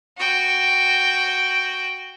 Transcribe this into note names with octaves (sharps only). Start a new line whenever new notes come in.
F#4 G5